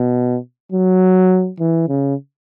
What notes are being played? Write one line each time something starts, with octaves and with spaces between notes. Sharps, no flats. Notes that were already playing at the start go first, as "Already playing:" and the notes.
Already playing: B2
F#3
E3
C#3